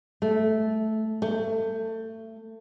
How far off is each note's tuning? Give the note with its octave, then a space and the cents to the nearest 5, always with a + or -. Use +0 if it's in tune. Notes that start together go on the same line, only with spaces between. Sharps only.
A3 -10
A3 +25